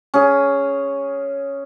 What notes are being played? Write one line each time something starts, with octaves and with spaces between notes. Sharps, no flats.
C#4 G#4